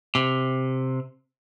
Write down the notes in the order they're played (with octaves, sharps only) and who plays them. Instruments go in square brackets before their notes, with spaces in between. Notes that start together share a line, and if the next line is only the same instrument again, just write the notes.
[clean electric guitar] C3